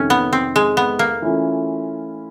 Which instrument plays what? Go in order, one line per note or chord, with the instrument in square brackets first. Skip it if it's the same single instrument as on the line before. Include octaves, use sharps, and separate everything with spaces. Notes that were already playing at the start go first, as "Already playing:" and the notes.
Already playing: [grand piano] F2 C3 D#3 [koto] C#4
[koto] B3
C4
G#3
B3
A#3
[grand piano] E3 A3 C#4 F4